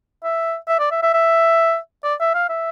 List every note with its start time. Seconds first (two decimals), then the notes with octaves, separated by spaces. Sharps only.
0.23 E5
0.68 E5
0.80 D5
0.91 E5
1.03 E5
1.13 E5
2.04 D5
2.20 E5
2.34 F5
2.49 E5